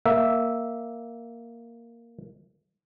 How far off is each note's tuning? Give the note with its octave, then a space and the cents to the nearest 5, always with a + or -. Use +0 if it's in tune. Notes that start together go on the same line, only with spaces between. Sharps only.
A#3 +0 E5 +0